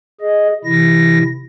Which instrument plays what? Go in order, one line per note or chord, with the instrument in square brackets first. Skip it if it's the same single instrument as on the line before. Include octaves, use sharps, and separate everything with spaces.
[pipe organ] G#4 D#5
C3 E3 E4 A#6